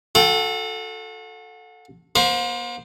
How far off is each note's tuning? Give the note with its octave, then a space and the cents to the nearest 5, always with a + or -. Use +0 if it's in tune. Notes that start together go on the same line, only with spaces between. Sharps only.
F#4 -40 A4 +0 G5 +0
A#3 +45 C5 +0